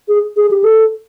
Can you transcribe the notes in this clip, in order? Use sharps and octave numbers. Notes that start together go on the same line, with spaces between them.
G#4
G#4
G4
A4